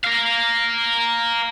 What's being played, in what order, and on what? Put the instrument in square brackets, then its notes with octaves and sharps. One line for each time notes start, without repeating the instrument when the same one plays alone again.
[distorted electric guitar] A#4 F5